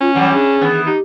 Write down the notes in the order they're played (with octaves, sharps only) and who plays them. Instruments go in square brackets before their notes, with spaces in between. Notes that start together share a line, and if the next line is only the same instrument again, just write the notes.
[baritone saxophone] C#4 [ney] F4
[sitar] E3 F#3 G3 [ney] F#5
[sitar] D4 [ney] G#4
[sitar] D#3 E3 B3
[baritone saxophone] D#4 [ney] G4